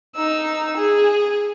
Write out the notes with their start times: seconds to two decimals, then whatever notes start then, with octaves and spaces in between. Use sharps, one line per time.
0.16 D#4 E6
0.77 G#4